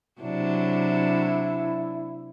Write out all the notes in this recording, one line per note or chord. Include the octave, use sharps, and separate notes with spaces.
C3 F#3 D4 E4